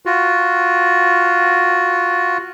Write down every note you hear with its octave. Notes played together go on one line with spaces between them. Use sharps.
F4 F#4